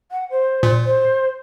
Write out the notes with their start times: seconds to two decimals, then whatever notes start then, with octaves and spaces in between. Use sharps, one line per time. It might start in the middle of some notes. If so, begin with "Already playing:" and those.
0.11 F#5
0.30 C5
0.63 A#2
0.84 C5